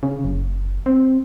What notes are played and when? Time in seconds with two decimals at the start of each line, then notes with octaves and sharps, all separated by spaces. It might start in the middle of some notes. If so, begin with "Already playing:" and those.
0.03 C#3
0.24 F#1
0.86 C4